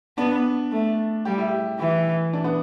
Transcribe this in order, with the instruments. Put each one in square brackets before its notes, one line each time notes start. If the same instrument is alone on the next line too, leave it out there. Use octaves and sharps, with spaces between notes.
[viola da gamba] B3 [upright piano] D4
[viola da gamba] A3
[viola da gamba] G3 [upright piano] G4
[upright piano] E4
G4
[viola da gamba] E3 [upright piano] E4
[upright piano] D4
B3